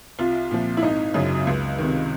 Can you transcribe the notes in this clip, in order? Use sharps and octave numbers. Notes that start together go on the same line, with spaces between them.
C2 F4
A#2 F3
E4
G#1 D#4
F#2 C#3 F#3
C#2
C3 D#3